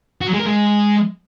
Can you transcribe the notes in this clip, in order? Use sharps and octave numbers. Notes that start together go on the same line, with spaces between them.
F#4
F#3
G#3
A#4
G#3